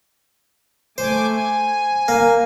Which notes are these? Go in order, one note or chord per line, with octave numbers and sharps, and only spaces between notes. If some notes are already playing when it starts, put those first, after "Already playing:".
A3 C5 G#5 D6
G#5
A#3